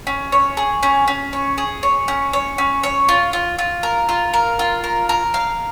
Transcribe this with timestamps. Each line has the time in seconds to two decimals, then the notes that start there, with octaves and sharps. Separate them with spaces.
0.07 C#4
0.32 C#5
0.57 G#4
0.83 C#4
1.08 C#4
1.33 C#5
1.58 G#4
1.83 C#5
2.08 C#4
2.33 C#5
2.58 C#4
2.83 C#5
3.09 F4
3.33 F4
3.59 F4
3.83 A#4
4.09 F4
4.34 A#4
4.59 F4
4.84 A#4
5.09 A#4
5.34 F5